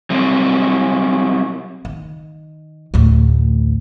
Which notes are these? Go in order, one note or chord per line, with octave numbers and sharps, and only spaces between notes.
F#3 G3 C4
D#3
A1 D2